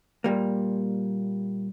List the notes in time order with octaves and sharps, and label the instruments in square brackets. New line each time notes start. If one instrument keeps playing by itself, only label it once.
[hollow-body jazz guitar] A#2 G3 A#3